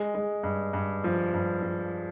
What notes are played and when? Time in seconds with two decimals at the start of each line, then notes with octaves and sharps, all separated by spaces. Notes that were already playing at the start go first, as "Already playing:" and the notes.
Already playing: G#3
0.15 G#3
0.43 G2
0.73 G2
1.04 F3
1.34 G2
1.63 F3